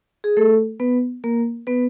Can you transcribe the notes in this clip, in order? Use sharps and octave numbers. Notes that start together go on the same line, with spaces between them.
G#4
A3 A4
B3 B4
A#3 A#4
B3 B4